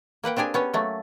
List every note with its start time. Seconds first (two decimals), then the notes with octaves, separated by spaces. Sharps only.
0.24 A#3 B4 F#5 G5
0.36 C4 D4 G4 G#4 G#5
0.54 B3 C#4 C#5
0.74 F#3 A3 A#3